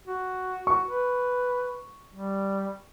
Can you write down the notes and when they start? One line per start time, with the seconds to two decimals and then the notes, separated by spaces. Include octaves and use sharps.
0.07 F#4
0.67 F#4 C#6
0.86 B4
2.14 G3